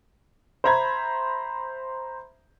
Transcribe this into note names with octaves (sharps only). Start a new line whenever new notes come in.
C5 E5 A#5 B5 G#6